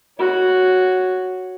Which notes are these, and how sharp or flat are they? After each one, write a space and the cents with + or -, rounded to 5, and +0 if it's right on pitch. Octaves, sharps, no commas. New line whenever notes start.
F#4 +0 C#5 +0